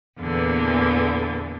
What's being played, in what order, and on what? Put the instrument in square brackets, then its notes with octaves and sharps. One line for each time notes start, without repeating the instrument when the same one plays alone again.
[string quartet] E2 A#2 D3 E3